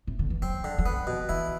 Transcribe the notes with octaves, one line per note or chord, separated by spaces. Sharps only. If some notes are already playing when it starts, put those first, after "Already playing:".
C3
D3
E3
F#3 C4
D3
F#3
E3 B3
B2
E3 E4